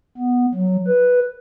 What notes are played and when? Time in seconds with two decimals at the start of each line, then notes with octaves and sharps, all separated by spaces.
0.17 B3
0.55 F#3
0.88 B4